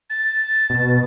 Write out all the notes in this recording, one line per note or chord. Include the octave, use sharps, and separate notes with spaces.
A6
B2